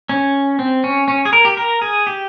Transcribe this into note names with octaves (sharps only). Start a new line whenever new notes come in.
C#4
C4
C#4
C#4
G#4
A#4
G4
A#4
G#4
G4